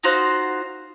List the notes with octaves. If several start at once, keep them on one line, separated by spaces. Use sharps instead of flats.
D#4 F4 F#4 C5